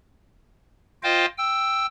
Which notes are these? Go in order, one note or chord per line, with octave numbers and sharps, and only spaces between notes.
F4 C5 D#5 F5 G5
G5 E6